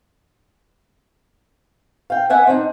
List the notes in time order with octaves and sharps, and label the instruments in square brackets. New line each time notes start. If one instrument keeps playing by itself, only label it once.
[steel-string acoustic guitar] F5 G5
D5 E5 F#5 G#5
C4 D4 D#4